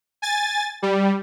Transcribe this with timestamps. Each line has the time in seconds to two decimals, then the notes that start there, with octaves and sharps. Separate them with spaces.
0.22 G#5 A6
0.82 G3